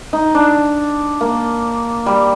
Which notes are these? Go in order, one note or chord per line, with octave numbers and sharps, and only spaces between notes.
D#4
D4
A#3
G3